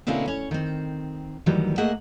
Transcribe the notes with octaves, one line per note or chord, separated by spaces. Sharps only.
B2 D3 A#3 C4 C#4 E4
C#4 C#5
D#3 C4
D2 D#3 E3 F#3 G3
A3 A#3 G#4 D#5 E5 F#5